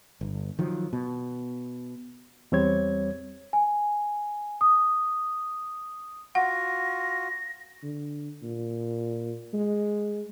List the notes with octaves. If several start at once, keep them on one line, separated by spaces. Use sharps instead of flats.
G1
D#3 F3 F#3
B2
E2 G3 C4 C#5 G#6
G#5
D#6
F4 F#4 F#5 A#6
D3
A#2
G#3